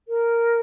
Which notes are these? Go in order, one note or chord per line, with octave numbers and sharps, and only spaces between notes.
A#4